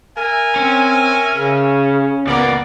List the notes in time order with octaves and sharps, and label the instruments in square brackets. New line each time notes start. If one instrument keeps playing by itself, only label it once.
[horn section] A#4 E5 G#5
[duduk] C4 [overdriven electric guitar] C#4
[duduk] C#3
[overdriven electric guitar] C#2 A#3 [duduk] B3 [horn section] D5